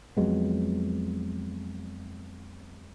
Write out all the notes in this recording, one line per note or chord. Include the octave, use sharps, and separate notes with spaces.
F2 F#3 G#3 B3